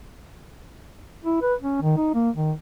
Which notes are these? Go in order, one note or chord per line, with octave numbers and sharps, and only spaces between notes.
E4
B4
C#4
D#3
D#4
A#3
D#3